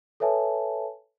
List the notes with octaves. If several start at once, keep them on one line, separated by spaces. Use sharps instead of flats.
A4 B4 C#5 E5 G#5 A5